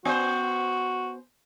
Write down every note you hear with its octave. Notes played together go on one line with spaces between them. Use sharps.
B3 F#4 C5